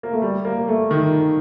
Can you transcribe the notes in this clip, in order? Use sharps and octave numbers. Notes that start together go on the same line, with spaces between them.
A#3
A3
G3
A#3
A3
D#3